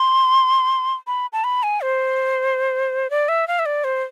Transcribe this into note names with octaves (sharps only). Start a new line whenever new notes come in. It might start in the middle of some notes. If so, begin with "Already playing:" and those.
Already playing: C6
B5
A5
B5
G#5
C5
D5
E5
F5
E5
D5
C5